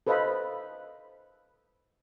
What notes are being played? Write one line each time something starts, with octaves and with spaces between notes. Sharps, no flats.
A4 B4 C5 D#5 F5 B5